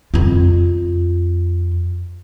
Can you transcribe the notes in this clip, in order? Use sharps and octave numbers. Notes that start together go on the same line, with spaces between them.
F2 F4